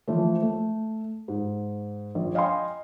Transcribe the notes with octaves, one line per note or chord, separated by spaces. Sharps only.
E3 F3 A3
A3
G#2
A#1
D#5 F5 G5 G#5 C6